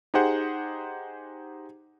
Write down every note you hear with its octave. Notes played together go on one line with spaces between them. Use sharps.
D#4 G4 G#4 C5 F#5